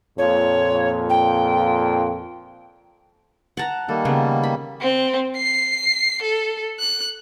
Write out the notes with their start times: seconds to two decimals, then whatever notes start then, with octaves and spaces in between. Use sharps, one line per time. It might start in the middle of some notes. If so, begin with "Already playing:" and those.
0.18 F2 A#2 C#5
1.09 G5
3.57 F#5 A5 A#5
3.89 D#3 G3 A#3 A4
4.05 C#3 B3
4.43 B5
4.81 C4
5.36 C7
6.23 A4
6.80 F#6